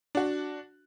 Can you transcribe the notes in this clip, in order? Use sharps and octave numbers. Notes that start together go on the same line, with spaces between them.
D4 F#4